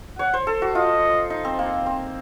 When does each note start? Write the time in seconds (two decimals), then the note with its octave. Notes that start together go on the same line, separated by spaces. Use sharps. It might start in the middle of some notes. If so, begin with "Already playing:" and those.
0.19 C#5 F#5
0.34 C5
0.47 A4
0.62 F#4
0.75 F4 D#5
1.30 D#4
1.45 C4
1.59 A#3
1.86 C4